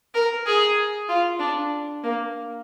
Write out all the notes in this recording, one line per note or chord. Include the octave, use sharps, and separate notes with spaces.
A#4
G#4
F4
D4
A#3